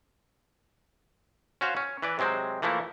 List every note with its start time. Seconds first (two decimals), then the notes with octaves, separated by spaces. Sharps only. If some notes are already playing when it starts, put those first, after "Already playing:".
1.61 C#4 F#4 C5 F5
1.77 C#4
2.02 E3 B4 D5
2.19 C3 F#3 G#3 C4 C5
2.62 E3 F3 A3 A#3 E4